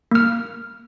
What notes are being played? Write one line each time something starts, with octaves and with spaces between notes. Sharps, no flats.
A#3 F6